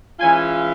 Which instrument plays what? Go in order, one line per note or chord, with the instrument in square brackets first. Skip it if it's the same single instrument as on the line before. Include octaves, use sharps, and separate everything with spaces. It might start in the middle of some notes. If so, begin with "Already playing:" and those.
[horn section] E3 G#3 C#4 F4 G#5